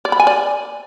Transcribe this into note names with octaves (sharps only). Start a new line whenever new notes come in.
D5
B5
G#5
D5